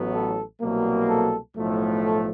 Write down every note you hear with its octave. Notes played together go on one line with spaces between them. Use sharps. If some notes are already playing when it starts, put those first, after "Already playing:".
Already playing: A1 A2 F#3 B3
A4
C2 B2 F#3 A#3
A4
B1 A2 F3 A3
A4